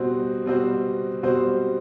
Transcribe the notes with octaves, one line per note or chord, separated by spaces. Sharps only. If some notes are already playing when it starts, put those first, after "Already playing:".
Already playing: B2 G3 C4 F#4 C5
B2 G3 C4 F#4 C5
B2 G3 C4 F#4 C5